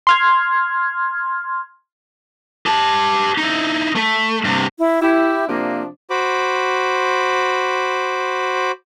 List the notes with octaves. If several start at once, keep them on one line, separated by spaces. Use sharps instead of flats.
C6 F6 G#6
G4 A5
D#4 E4
A3
G2 C3
E4
E4 G4
C3 F3 A#3 D4
F#4 C5 B5 D6